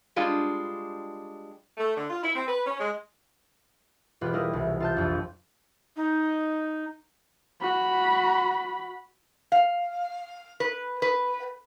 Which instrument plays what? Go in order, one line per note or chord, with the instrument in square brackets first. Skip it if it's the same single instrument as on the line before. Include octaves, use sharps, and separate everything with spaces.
[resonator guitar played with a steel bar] G3 G#3 D4 F4
[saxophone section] A3
D3
F4
E4
C4
B4
C#4
G#3
[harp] E1 F4 G4 B4
G3 E4 G#4 A#4
C2
F4 A5 G6
A#1 F2
[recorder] D#4
[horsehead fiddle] F#4 B5
[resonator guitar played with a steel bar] F5
B4
B4